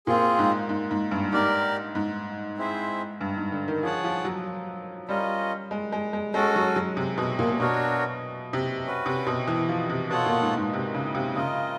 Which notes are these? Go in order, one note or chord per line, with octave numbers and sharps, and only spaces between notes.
A#2 C4 F4 G#4
G#2
G#2
G#2
G2
G#2 G4 A#4 D5
G#2
C4 E4 G#4 C5 E5
G2
G#2
D3
D#3
F3 G#4 C#5 F#5 A5
F3
F#3
G3 C#4 F4 A#4 D#5
G#3
G#3
G#3
G#3 C#4 F#4 A4
F#3
F#3
C3
B2
A#2
A#2
B2 D4 F#4 A#4 C#5
C3
C#4 F#4 B4
C3
B2
E3
F3
C3
B2 F4 A4 C#5 F#5 A5
A#2
G#2
G#2
C3
C#3
C3
C#3 F4 A#4 D#5